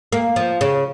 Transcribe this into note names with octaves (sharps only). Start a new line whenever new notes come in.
A#3
F3
C#3